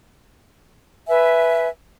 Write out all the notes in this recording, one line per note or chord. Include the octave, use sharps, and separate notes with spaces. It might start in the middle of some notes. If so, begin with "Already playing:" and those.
B4 E5 G#5